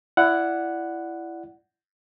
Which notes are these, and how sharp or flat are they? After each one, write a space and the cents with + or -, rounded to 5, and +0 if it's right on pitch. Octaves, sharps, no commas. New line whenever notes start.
E4 +20 D5 +0 F#5 +0